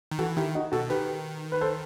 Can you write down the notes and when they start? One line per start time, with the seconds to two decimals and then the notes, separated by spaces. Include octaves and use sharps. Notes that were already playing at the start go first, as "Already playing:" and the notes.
0.11 D#3
0.19 E3 F#4 A4
0.37 D#3 E4 G4
0.55 D#4 F#4
0.72 B2 F#4 A4
0.90 D#3 G4 B4
1.52 B4
1.61 A4 C5